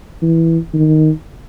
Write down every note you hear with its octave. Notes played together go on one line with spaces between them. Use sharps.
E3
D#3